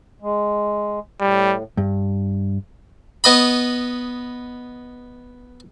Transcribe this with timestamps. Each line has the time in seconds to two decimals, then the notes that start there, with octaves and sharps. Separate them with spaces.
0.22 G#3
1.20 A2 G3
1.77 G2
3.24 B3 D#5 B5